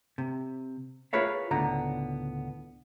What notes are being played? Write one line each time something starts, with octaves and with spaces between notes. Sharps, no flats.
C3
F4 G#4 A#4 B4 C#5 E5
C#2 A2 D3 B3 A#5